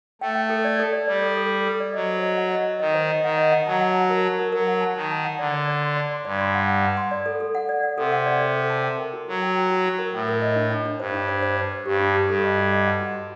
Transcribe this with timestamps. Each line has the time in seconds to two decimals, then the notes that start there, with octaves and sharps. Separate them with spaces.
0.21 A3 G5
0.35 G5
0.50 A4
0.65 D5
0.80 A4
0.93 D5
1.07 G3 D5
1.22 A4
1.37 A4
1.51 A4
1.65 A4
1.80 D5
1.94 F#3 D#5
2.08 C5
2.23 D#5
2.37 F#5
2.52 D#5
2.65 D#5
2.80 D#3 D#5
2.94 C5
3.10 D#5
3.23 D#3 F#5
3.37 D#5
3.52 F#5
3.67 F#3 A5
3.81 F#5
3.95 A5
4.10 A#4
4.24 A5
4.39 A#4
4.52 F#3 A#4
4.67 F#5
4.81 A5
4.96 D#3 A5
5.11 A5
5.25 F#5
5.39 D3 D5
5.54 D5
5.67 D5
5.82 C6
5.97 D5
6.11 C6
6.25 G2 D5
6.40 C6
6.54 F#5
6.68 F#5
6.82 F#5
6.97 C6
7.11 D5
7.26 A4
7.40 A4
7.55 F#5
7.69 D5
7.83 F#5
7.98 C3 A4
8.12 F#5
8.26 D5
8.41 A4
8.55 A4
8.70 A5
8.84 G5
8.98 A#4
9.13 F#4
9.27 F#3 F#4
9.41 G5
9.56 G5
9.70 F#4
9.85 F#4
9.98 A#4
10.13 A2 G5
10.28 A#4
10.42 D#5
10.56 D4
10.71 D4
10.85 D4
10.99 G2 C5
11.14 D4
11.29 C5
11.43 C5
11.58 C5
11.72 C5
11.86 G2 G4
12.00 D4
12.14 G4
12.29 G2 A4
12.44 D#5
12.58 F#4
12.72 D#5
12.87 F#5
13.00 F#4
13.16 F#4